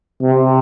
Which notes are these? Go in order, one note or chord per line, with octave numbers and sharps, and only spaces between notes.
C3